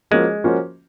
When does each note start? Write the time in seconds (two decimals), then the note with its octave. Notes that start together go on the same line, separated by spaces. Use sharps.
0.11 F3 G#3 A#3 C#4 F#4 C5
0.44 F3 A#3 C#4 F#4 C5